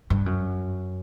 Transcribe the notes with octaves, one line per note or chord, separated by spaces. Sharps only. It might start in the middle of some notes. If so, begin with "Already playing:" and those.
G2
F#2